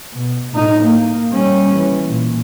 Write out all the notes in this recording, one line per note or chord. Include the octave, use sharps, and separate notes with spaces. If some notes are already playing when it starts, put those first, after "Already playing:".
B2
A2 D#4
A#3
G3 C#4
E3
A#2